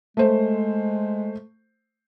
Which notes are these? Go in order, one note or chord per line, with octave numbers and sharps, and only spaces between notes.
G#3 A3 C5